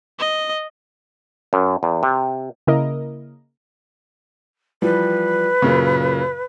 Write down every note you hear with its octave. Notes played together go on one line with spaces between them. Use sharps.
D#5
F#2
E2
C3
C#3 A#3 E4 A#4 D#5
E3 F3 G3 B4
F#2 A#2 C#3